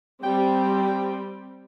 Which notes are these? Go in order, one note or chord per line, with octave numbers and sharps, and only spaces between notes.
G3 C4 G5